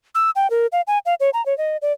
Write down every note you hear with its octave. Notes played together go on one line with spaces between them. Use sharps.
E6
G5
A#4
F5
G#5
F5
C#5
A#5
C#5
D#5
D5